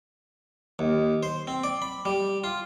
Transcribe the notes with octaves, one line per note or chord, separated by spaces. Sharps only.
D#2
C5
C4
D5
B5
G3
F4